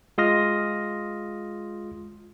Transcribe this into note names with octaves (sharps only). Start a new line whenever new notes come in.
G#3 F4 C6 D#6 F6 A#6